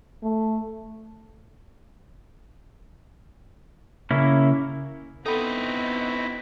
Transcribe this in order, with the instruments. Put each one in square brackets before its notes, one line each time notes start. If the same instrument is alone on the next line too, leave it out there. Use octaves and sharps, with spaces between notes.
[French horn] A3
[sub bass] C#3 [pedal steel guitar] A#3 C#4 E4
[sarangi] B3 [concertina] C4 F#4 [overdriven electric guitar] D#4 E4 [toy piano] A4 G5 B5